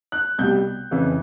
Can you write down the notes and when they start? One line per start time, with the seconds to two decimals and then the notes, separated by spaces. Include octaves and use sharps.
0.12 F#6
0.38 C2 B2 G3 G6
0.91 F2 C#3 E3